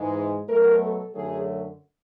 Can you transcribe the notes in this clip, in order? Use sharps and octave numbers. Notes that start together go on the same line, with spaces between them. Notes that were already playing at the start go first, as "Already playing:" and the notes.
Already playing: G#2 E3 G#3
B2 F#3 A3 A#4
A4
F#2 D3 F#3 A3 G#4